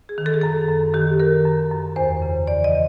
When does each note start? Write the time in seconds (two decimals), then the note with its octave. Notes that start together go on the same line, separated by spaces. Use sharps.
0.09 G#4
0.18 D#3
0.26 A4
0.34 G#4
0.41 F#2 A4
0.68 F#2
0.94 D#3 G4
1.20 D#3 A#4
1.46 F#2
1.71 F#2
1.96 E2 C5
2.22 C#3
2.47 E3 D5
2.64 D#5